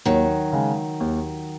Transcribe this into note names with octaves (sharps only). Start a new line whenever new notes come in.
D#2 D#3 F#3
C#3 G#3
D#2